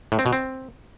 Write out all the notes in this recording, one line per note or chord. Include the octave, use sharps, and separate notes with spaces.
A2
C4
B2
C4